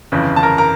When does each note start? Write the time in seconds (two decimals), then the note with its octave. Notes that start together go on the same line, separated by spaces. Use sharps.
0.12 G1 F2 C#3 E3
0.36 A5
0.43 A#4 A#5
0.58 A#4 A#5